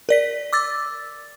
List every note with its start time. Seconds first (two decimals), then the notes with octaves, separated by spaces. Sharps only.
0.09 A#4 D5 B6
0.53 D6 E6 A6